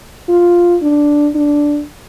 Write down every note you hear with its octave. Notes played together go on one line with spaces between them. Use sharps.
F4
D4
D4